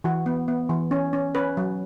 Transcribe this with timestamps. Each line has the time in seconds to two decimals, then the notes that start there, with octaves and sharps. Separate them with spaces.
0.04 E3 F#4
0.26 B3
0.48 B3
0.69 E3
0.91 C#4
1.13 C#4
1.35 C#4 B4
1.57 F#3